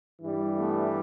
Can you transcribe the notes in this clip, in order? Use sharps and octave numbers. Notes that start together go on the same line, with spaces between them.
G2 E3 G3
A3 B3